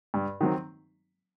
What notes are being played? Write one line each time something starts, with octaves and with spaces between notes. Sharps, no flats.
G2
D#3 F#3 C4